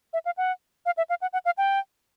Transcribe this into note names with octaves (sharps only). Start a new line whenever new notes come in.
E5
F5
F#5
F5
E5
F5
F#5
F#5
F5
G5